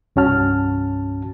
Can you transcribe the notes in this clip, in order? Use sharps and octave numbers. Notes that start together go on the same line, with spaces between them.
C2 G2 C#4 F#4 A5 F6